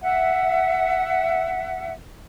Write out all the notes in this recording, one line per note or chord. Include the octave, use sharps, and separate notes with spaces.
E5 F#5